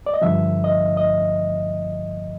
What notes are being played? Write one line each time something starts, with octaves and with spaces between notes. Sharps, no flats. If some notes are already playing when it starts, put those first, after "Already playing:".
D5
D#5
G2 D3 F3 E5
D#5
D#5